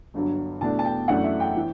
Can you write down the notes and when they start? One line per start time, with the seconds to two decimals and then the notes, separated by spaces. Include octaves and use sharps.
0.14 G1 G2 F#3
0.61 E2 B2 A3 D4 A5
0.79 A5
0.85 G5
1.08 F#2 E3 A3 D4 F#5
1.24 E5
1.40 G5
1.56 E3